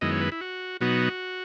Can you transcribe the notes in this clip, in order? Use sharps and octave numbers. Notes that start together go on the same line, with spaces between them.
F#2 D#3 G#3 B3 E4 D#5
C#5
B4
E4
F#4
B2 F#3 B3 D#4 F#4